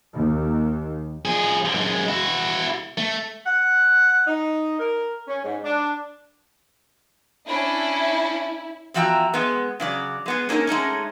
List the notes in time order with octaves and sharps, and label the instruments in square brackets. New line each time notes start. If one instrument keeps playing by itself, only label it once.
[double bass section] D#2
[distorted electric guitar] F3 G#4
F#2 G#3
E4 F#4
A3
[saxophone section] F#5
D#4
A#4
C#4
G#2
D4
[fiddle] C#4 D4 [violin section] E4
[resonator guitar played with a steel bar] E2 F3 F#4 E5 G5 A#5
G#3 B3
C#3 F#3 D5
G#3 B3 G#4
A#3 C#4 D#4 G#4 A#4
G#3 A3 C#4 D#4